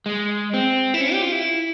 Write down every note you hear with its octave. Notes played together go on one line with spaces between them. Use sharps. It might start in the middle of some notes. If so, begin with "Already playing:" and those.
G#3
C4
E4
C#4
G4
F4
E4